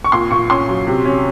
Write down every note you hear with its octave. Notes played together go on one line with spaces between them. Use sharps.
C#6
A#2 C6
A#2 C#6
C#4 C6
F#3
C3
C#4